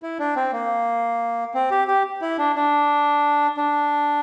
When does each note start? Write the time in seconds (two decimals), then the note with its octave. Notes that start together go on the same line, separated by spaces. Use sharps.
0.03 E4
0.19 D4
0.36 C4
0.53 A#3
1.54 C4
1.71 G4
1.88 G4
2.22 E4
2.38 D4
2.56 D4
3.57 D4